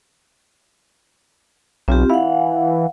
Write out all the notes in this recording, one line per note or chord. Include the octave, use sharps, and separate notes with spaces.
B1 C4 F4 G4
E3 F5 F#5